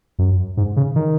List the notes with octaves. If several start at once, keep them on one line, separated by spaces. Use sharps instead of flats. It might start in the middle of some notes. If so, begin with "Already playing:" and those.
F#2
G#2
C#3
D#3